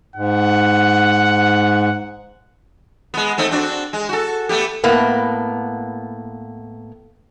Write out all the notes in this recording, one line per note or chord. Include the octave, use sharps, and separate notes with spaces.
G#2 F#5
G#3 B3
A3 C4 D#4
C4 D4 F#4
G#3
F#4 A4
A3 B3 G4
A2 A#3 B3